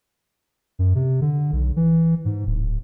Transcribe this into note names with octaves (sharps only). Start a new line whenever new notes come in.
F#2
C3
D3
B1
E3
G#2
D1